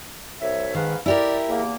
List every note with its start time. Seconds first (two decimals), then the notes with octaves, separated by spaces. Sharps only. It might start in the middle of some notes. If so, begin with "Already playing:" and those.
0.40 C2 C#5 E5
0.75 G#2 D#3 B4 F5
1.06 E4 G4 A#4 D5
1.48 E2 A#3